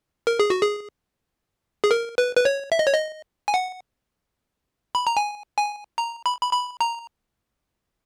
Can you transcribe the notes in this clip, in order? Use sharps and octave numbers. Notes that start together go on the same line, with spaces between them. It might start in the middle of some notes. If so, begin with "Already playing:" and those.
A#4
G#4
F#4
G#4
G#4
A#4
B4
B4
C#5
E5
D#5
C#5
D#5
G#5
F#5
B5
A#5
G#5
G#5
A#5
B5
B5
B5
A#5